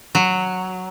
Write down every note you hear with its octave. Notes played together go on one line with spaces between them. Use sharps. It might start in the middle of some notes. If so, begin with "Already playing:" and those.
F#3